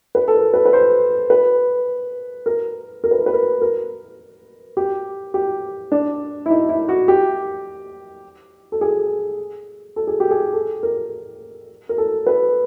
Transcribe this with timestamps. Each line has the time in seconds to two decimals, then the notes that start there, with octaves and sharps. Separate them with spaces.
0.15 B4
0.28 A4
0.35 A#4
0.54 B4
0.66 B4
0.73 C5
1.30 B4
2.46 A#4
3.04 A#4
3.11 B4
3.19 A#4
3.26 B4
3.33 A#4
3.62 A#4
4.77 G4
5.34 G4
5.92 D4
6.46 E4
6.50 D#4
6.69 E4
6.89 F#4
7.08 G4
8.72 A4
8.81 G#4
9.96 A4
10.07 G#4
10.20 G4
10.31 G#4
10.54 A4
10.83 A#4
11.89 A#4
11.98 A4
12.27 B4